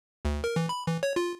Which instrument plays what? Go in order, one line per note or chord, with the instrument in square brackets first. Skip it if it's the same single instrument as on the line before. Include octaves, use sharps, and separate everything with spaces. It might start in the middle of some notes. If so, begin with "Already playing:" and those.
[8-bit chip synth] D2
A#4
E3
B5
E3
C#5
F4